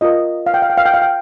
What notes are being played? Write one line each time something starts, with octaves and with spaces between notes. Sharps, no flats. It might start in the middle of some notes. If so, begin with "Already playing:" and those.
F4 A#4 D#5
F5
G5
F5
G5
F5
G5
F5
G5